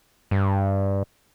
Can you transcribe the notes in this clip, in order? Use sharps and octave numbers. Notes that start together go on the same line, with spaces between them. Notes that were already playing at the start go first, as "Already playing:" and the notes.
G2